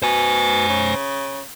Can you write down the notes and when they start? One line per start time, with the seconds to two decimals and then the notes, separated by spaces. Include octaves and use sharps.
0.02 B2 C5 G#5
0.69 C#3